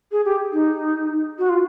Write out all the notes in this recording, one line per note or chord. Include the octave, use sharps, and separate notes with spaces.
G#4
G4
D#4
F#4
F4